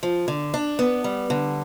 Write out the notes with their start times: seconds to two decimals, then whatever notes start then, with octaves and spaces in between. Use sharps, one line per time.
0.03 F3
0.28 D3
0.54 D4
0.79 B3
1.04 G3
1.30 D3